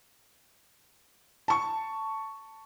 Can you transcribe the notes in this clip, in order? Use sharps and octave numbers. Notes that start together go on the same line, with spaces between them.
A5 C#6